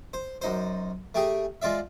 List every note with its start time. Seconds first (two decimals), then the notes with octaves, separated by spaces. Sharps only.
0.14 C5
0.42 F#2 D#4 C5
1.15 A3 G4 G#4 A#5
1.62 G#3 F4 D5 E5